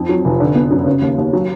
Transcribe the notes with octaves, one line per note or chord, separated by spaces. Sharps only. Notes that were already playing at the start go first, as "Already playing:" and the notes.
Already playing: F2
F#3
F1
D3
B3
F#2
C#3
D#2
D#2
F#3